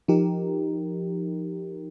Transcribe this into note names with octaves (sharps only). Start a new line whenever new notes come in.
F3 D#4 G4 A#4